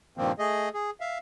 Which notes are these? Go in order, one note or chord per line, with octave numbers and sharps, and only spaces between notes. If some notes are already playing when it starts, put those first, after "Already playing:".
G2 A#2 D#3 F3 A#3 C4
A3 G#4 D#5
G#4
E5 F5